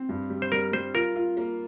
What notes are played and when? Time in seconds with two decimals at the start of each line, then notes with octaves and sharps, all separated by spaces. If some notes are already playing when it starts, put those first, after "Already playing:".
Already playing: C4
0.09 G2
0.30 G3
0.42 C5
0.52 G3 A#4
0.72 G3 C5
0.94 F4 A#4
1.16 F4
1.37 A#3